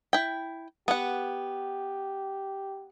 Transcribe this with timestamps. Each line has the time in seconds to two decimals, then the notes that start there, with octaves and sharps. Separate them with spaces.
0.13 E4 G5
0.88 B3 G4 F#5